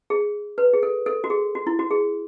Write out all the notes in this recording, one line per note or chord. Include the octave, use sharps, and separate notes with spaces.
G#4
B4
G#4
A4
A4
F#4
G#4
F#4
E4
F#4
G#4